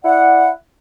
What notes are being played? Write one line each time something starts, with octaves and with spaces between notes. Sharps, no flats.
E4 D5 F#5